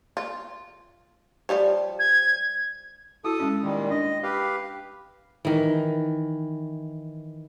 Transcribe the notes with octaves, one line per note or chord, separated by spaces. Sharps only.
F4
F3 G3 C#5
G#6
E4 F#4 A4 D#6
G#3 C#4
A#2 D#3 G3
D4 D#5
G4 B4 F5
D#3 E3